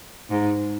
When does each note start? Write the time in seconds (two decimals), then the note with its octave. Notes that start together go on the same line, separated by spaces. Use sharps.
0.30 G#2